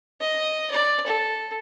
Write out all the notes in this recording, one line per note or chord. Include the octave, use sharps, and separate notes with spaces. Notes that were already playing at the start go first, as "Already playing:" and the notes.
D#5
D5
A4